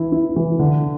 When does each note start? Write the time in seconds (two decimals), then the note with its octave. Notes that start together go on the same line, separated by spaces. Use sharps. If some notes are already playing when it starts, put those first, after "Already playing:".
Already playing: E3 E4
0.12 E4
0.36 E3
0.59 D3